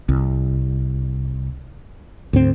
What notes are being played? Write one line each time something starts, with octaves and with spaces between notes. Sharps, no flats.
C2
D2 G#2 C4